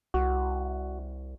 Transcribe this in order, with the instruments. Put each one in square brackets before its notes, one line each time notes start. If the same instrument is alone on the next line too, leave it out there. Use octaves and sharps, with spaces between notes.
[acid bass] C2 [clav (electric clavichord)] F#4